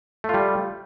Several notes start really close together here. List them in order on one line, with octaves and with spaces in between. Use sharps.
A3 F4 G3